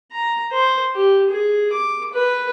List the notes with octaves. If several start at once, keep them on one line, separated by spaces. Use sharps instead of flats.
A#5
C5
G4
G#4
D6
B4